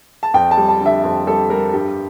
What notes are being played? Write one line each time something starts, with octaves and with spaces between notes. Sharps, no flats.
A5
F2 G5
A5
G3
A5
D3 E5
F2
G3 A4
G3 A#4
G2 G4